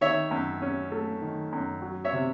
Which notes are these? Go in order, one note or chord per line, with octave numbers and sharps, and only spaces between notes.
D#3 C#5 E5
F#2
C#4
A3
D#3
F#2
F#3
C#5 E5
C3